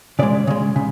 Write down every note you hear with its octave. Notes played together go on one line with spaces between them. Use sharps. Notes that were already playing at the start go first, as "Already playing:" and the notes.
C#3 G#3 D5
C#3 G#3
C#3